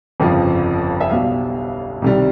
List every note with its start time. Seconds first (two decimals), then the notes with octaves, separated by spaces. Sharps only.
0.20 G1 F2 C#3 F3
1.01 E5
1.10 B1 B2 G3 F5
2.02 C2 C3 D#3 G3